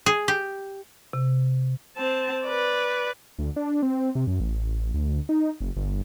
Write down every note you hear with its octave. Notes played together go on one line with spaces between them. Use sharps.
G#4
G4
C3
C4 A5
B4 D5
D2
D4
C4
C3
F#2
A1
D2
D#4
F#1
G1